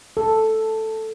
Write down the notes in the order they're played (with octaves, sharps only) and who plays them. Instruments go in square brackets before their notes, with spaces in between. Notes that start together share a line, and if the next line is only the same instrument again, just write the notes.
[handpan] A4